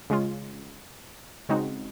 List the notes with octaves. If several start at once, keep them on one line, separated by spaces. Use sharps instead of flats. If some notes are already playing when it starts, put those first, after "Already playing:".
C#3 G#3 C#4 F4
C#3 G#3 C4 D#4 F#4